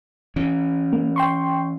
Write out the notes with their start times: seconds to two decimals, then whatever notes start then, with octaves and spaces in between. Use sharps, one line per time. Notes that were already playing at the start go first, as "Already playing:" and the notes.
0.36 E3 C#4
0.93 A#3
1.16 G5 C6 C#6